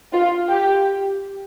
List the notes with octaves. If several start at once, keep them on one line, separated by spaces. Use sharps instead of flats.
F4
G4